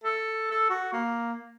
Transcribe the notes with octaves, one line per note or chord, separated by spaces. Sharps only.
A4
A4
F#4
A#3